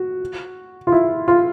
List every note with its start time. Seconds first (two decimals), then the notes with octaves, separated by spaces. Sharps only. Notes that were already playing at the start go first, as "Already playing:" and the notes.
Already playing: F#4
0.87 F4
0.92 E4
1.28 F4